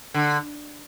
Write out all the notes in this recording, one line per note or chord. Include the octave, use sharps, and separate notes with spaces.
D3